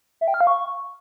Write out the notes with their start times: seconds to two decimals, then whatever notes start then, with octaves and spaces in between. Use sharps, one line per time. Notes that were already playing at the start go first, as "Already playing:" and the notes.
0.21 E5
0.28 G5
0.34 F6
0.41 F5
0.47 C#6